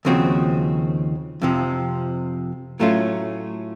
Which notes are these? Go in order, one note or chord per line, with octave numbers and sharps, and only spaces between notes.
D#2 C#3 F3 C4 F#4
F2 C3 F3
A2 F#3 A3 C#4 F4